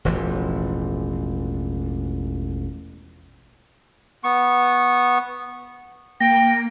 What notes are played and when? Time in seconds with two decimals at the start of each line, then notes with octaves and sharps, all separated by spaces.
0.05 E1 A1 E3 F3
4.24 B3 C#6
6.21 A#3 G5 A#6